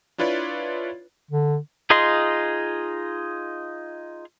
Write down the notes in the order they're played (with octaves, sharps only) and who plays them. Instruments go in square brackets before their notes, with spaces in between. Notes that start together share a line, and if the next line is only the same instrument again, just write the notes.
[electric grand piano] D4 E4 F4 B4 C#5 D5
[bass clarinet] D3
[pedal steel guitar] D#4 F4 G#4 D#5 C6